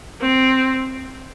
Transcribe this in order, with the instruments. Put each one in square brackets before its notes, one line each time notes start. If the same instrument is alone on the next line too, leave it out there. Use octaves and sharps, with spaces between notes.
[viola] C4